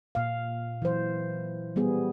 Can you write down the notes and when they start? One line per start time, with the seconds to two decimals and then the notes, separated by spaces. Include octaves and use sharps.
0.15 A#2 F5
0.82 E3 F#3 C5
1.76 G3 B3 G#4